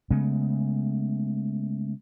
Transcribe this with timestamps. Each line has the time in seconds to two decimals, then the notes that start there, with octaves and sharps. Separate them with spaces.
0.11 C#3 G#3 A3 B3